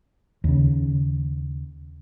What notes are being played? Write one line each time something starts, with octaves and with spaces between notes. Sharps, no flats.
D#2 C#3